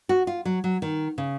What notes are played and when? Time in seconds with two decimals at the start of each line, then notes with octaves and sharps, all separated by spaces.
0.09 F#4
0.27 F4
0.45 F#3
0.64 F#3
0.82 D#3
1.18 C#3